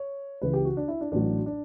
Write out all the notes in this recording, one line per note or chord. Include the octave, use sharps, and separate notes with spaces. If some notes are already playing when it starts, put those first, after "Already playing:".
Already playing: C#5
C#2 C#3 E3 B4
G4
F#4
D4
E4
D4
A1 A2 F#3 D4
D4